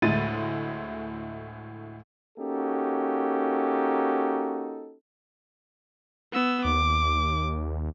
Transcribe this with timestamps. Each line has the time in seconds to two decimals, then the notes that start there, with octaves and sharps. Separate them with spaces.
0.02 D2 A2 G#3 E4 A6 D#7
2.38 A#3 C#4 D#4 F#4 G4 A4
6.32 B3 E6
6.65 D#2 D6